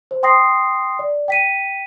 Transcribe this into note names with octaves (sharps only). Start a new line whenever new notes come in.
C5
G5 C6 D#6 A#6 C7
D5
G5 B6 D#7